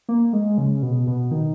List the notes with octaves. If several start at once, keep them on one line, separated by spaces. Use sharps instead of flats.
A#3
G#3
C#3
B2
B2
D#3